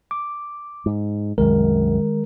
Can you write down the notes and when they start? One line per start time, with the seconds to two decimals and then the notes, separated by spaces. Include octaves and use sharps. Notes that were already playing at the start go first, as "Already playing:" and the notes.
0.11 D6
0.86 G#2
1.38 C2 F#2 D#3 G#3 A#4